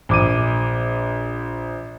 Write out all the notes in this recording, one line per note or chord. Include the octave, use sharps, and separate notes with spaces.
A#1 D6 D#7